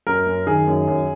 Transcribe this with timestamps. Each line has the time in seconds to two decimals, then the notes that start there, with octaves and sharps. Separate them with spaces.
0.07 F#2 A#4
0.26 F#2
0.47 D#3 G#4
0.67 F#2
0.87 F#2